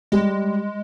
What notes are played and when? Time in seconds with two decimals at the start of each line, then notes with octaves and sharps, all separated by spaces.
0.12 G3 G#3